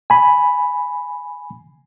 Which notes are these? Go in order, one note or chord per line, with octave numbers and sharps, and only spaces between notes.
G#5 B5